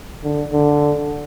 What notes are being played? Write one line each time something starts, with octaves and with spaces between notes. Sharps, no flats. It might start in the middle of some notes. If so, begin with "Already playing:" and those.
D3
D3